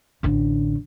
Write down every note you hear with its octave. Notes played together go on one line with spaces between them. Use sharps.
A1 D3